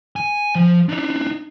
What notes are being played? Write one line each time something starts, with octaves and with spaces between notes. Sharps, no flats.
G#5
F3
D4 D#4